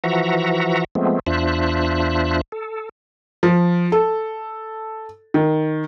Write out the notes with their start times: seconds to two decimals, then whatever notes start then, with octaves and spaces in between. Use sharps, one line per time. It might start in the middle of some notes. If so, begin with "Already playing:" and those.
0.04 E3 F3 F#4 E5 F#5 A#5
0.95 F3 G#3 A3 B3 C4
1.27 E2 D4 F4 C5 E5 F#6
2.52 A4
3.43 F3
3.92 A4
5.34 D#3